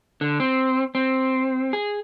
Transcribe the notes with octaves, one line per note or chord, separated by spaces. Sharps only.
D3
C4
C4
G#4